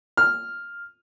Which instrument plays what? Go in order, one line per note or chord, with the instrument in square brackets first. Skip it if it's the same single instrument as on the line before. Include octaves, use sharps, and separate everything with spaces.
[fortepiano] F6